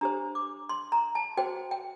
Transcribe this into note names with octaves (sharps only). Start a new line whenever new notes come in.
D4 G4 C5 A#5
D6
C6
A#5
A5
F#4 C5 G5
G5